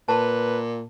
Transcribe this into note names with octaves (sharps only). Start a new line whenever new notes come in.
A#2 B4 A5